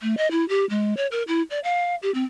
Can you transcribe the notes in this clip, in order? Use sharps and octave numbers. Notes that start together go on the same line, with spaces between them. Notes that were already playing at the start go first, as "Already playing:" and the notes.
A3
D#5
E4
G4
G#3
C#5
A#4
E4
D5
F5
G4
C4